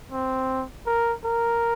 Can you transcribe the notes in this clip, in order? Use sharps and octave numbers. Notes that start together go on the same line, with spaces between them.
C4
A#4
A#4